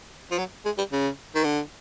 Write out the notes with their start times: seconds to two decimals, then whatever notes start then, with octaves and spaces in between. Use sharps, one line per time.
0.31 F3
0.38 F#3
0.65 G#3
0.78 G3
0.92 C#3
1.35 D#3
1.44 D3